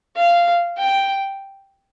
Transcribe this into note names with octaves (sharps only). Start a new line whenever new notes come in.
F5
G5